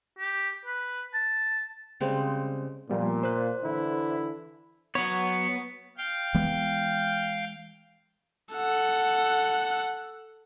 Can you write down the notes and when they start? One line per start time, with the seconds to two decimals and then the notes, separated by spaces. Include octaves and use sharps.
0.19 G4
0.66 B4
1.14 A5
2.00 C#3 G3 G#3 C4
2.90 A#2 F3 G3 B3
3.23 C5 F#6
3.64 D3 E3 E4
4.95 F#3 B3 C#5
5.98 F5 G5
6.35 E3 G#3 B3
8.54 A4 F#5